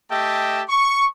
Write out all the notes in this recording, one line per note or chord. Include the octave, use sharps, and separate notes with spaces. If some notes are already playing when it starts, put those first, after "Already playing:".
A3 G4 D#5 E5 G5 A5
C#6